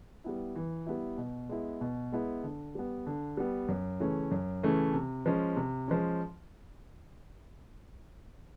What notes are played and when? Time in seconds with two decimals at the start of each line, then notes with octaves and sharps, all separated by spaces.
0.24 G3 B3 E4
0.56 E3
0.86 G3 B3 E4
1.18 B2
1.49 G#3 B3 E4
1.81 B2
2.12 G#3 B3 E4
2.43 D3
2.75 G3 B3
3.07 D3
3.37 G3 B3
3.68 F#2
4.00 C#3 E3 A3 C#4
4.31 F#2
4.63 C#3 E3 A3 C#4
4.94 C3
5.26 F3 G#3 C#4
5.56 C3
5.88 F3 G#3 C#4